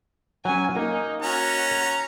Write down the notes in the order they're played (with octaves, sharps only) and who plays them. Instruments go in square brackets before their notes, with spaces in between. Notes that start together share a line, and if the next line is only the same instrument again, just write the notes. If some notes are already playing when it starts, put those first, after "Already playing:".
[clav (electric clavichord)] F#3 C#4 [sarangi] G#5
[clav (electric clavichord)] A#3 [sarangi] D#4
[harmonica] C#4 A#5 [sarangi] F#4